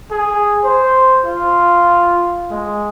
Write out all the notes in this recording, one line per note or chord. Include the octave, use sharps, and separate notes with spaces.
G#4
C5
F4
G#3